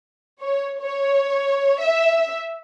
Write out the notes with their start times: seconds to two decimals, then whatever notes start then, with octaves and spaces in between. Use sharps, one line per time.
0.40 C#5
0.80 C#5
1.80 E5